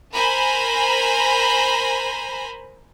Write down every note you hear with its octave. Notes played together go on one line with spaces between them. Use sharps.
A#4 C5 G#5 A#5 B5